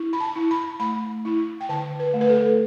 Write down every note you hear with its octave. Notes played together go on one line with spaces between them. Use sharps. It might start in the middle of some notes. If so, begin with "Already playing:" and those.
Already playing: E4
B5
A5
E4
B5
A3 B5
E4
G5
D3 A5
B4
A3
B4
A4